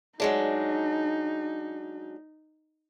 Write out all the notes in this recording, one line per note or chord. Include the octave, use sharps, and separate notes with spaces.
F#3 G#3 D4 D#4